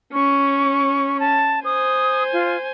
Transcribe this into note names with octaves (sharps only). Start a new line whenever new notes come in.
C#4 C#6
A5
C5 G#5 D#6
F4